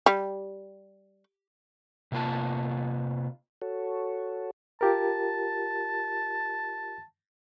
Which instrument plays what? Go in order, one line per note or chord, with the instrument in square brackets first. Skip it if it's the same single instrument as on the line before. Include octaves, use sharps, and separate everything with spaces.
[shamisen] G3
[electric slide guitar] C3 A#3 F4 A5
[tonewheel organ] F#4 A4 C#5
[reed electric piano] F4 G4 A#4 [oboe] A5